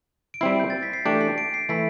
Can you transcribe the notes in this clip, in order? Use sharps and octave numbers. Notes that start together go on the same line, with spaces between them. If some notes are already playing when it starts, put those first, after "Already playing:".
D7
G3 C4 E4 C7
G6
A6
B6
C7
E3 A3 D4 G4 D7
C7
D7
C7
E3 A3 E4 B6